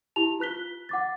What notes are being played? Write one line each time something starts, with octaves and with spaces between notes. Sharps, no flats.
E4 G4 A5 F7
F4 B4 F#6 B6 G7
F#5 D6 A6